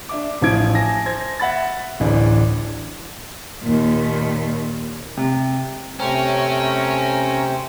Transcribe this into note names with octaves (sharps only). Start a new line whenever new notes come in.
D4 E5 D6
A1 F3 E4 G#6 D7
G#5 A5 A#6
C5 G#6 A#6
E5 F#5 B5 A6
D1 A1 E3 D4
D#2 A#2
C3
C3 A3 C#4 C5 G5 A#5